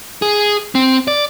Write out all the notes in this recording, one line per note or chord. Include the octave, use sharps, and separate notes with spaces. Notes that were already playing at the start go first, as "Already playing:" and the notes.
G#4
C4
D5